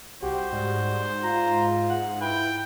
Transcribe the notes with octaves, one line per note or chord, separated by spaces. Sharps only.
C2 F#4 G4 C5
G#2 G3
F4 A#5
F#5
E4 B4 G5